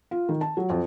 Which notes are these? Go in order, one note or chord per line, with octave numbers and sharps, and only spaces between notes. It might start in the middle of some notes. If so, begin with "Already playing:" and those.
F4
D#3
A5
F#3
F2